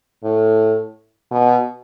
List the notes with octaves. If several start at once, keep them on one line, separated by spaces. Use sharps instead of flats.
A2
B2